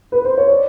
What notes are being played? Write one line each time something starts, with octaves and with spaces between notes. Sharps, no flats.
B4
C5
C#5
D5